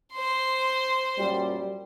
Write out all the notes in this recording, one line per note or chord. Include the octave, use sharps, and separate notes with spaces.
C5 C6
F#2 A#2 G3